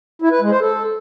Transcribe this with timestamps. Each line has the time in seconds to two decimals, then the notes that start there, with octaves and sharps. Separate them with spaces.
0.22 E4
0.32 B4
0.41 G#3
0.51 C5
0.61 A4